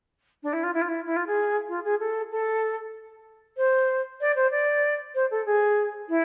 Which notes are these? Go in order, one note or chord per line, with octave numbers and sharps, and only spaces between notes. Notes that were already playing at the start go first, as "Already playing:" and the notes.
D4
E4
F4
E4
F4
E4
E4
F4
G#4
F4
G#4
A4
A4
C5
D5
C5
D5
C5
A4
G#4
E4